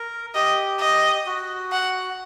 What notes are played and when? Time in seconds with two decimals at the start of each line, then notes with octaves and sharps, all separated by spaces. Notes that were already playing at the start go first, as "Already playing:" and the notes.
Already playing: A#4
0.35 G4 D#5
0.80 D#5
1.26 F#4
1.72 F#5